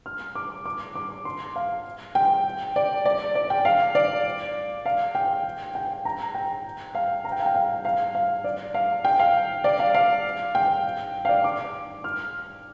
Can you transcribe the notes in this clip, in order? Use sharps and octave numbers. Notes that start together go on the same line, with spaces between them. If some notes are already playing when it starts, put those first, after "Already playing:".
F6
D6
D6
D6
C6
F5
G5
D5
D5
D5
G5
F5
D5
F5
G5
G5
A#5
G5
F5
A#5
G5
F5
G5
F5
F5
F5
D5
F5
G5
F5
D5
F5
F5
G5
F5
D5
D6
F6